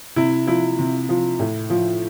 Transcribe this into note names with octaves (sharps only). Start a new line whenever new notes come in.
C3 E4
F3 E4
C3
F3
A2
F3